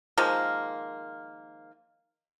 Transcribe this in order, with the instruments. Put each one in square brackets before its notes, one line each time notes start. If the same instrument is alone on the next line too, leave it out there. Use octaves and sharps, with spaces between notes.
[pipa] D#3 F3 G#3 A#3